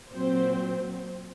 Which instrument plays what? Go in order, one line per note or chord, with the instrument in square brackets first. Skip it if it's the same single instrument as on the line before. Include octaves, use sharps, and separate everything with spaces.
[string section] A#2 F#3 C4 C5